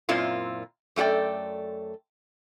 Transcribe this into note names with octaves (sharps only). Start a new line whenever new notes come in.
F#2 A#2 C4 E4 F4
F#2 A3 F#4 D5 G5